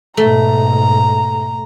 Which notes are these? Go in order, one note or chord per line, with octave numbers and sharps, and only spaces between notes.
G#2 B2 A3 A#5